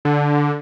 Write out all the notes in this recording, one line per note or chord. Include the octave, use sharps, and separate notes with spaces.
D3